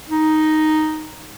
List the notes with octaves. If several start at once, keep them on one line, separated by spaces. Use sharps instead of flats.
D#4